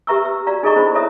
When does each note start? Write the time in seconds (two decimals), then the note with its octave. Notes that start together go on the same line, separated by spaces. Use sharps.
0.07 G4 B4 E5 A#5 C#6 E6
0.25 E6
0.47 F#4 D5 F5 A#5
0.63 D#4 G#4 A4 D#5 A#5 C#6
0.76 D4 E4 C5 B5
0.94 E4 A4 C#5 E5 A#5 D#6